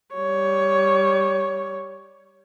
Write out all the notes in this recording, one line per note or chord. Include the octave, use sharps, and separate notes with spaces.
G3 C#5